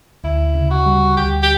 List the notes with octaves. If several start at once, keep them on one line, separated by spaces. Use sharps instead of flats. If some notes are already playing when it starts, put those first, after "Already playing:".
D2 E4
C#3
F#4
G3
D2 G4
G4